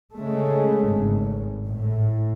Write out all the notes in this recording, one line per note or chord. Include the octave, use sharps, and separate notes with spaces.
C#3 G#3 A3
G#1
A2